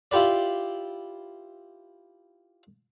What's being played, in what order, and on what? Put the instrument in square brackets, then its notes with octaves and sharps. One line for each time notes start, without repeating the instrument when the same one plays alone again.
[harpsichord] E4 F4 G4 B4 D5